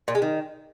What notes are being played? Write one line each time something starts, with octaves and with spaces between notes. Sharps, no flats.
A#2
G#3
D#3